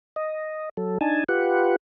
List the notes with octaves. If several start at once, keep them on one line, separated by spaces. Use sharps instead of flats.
D#5
F#3 A4
D4 D#4 G#5 A5
F4 G4 B4 F#5